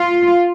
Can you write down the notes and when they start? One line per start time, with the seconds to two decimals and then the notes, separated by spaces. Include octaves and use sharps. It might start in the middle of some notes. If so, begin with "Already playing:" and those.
Already playing: F4